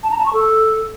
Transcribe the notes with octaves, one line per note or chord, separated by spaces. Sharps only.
A5
A#5
A5
C#6
A4